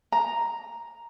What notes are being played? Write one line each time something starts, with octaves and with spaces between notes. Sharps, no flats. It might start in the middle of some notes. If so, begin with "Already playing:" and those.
A#5